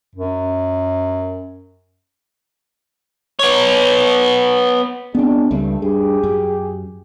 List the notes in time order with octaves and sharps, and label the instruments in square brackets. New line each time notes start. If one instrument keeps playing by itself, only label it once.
[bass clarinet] F#2
[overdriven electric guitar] B3 C#5
[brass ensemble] C#3 G#3 D4 [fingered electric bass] B3 C4
[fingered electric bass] C#2 G3 [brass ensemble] G2 A3
[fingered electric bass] G2 [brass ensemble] G4 G#4
[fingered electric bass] F#2